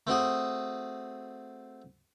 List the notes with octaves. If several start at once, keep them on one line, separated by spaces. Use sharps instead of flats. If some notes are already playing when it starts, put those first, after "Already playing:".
A3 C4 F#4 G#4